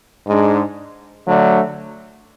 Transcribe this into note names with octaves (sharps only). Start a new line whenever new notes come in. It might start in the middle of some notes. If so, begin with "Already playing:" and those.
G#2 G#3 D4
D3 F#3 A3 D4